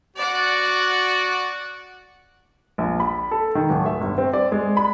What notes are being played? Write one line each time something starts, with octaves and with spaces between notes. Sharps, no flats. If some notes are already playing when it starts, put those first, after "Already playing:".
F#4 D5 F#5
A#1
B5
A4
D#3
D1
E5
G1
C4
D5
G#3
B5